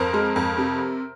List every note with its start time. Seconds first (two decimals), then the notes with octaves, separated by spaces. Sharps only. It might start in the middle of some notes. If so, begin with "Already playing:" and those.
Already playing: F2 A#4 C5
0.14 G#3
0.36 F2
0.58 C3